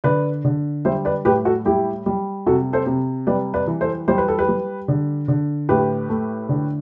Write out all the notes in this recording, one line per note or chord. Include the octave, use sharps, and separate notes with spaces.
D3 B4 D5
D3
G3 C5 E5
B4 D5
A2 G4 B4
F#4 A4
G3 E4 G4
G3
C3 F#4 A4
A4 C5
C3
G3 B4 D5
B4 D5
E3
A4 C5
G3 C5
B4
A4
G4 B4
G3
D3
D3
A2 G4 B4
A3
D3